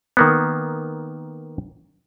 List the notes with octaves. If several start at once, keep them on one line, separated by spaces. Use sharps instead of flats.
D#3 A#3 B3